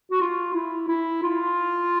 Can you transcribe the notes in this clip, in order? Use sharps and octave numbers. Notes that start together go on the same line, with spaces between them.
F#4
F4
E4
E4
F4